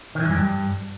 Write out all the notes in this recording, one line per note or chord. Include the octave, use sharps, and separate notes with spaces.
D#3
E3
G2
F#2
G2